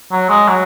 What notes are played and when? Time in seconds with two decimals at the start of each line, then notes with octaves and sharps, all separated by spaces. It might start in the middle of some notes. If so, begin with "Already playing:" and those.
0.12 F#3
0.29 G#3
0.48 F#3